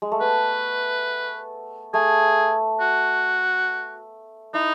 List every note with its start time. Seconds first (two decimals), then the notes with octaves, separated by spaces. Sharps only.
0.02 G#3
0.12 A3
0.21 B3 B4
1.94 A3 G#4
2.81 F#4
4.54 D#4 E4